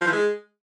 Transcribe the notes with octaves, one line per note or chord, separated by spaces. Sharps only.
F3
E3
G#3